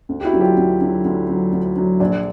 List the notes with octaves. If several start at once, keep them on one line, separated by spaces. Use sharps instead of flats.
D2
G4
E4 F#4
D3 F#3
F4 G4
D2
D3 F#3
D2
D3 F#3
D2
D3 F#3
A#1 D4